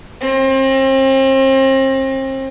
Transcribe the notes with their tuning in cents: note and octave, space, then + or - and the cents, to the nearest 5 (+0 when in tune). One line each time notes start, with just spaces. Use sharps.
C4 +35